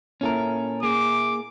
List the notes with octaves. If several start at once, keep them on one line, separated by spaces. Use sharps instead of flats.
A#2 C#4 E4 A4 A#4 E5
A#3 G#4 D6